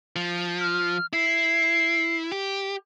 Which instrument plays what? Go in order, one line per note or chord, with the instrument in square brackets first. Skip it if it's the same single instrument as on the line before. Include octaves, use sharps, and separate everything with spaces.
[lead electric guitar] F3
[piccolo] F6
[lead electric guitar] E4 [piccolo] C7
[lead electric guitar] G4